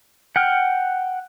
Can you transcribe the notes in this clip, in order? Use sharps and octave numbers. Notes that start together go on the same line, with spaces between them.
F#5 G5 F6